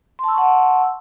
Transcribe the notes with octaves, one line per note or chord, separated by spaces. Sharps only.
F#5 A5 C6 C#6 E6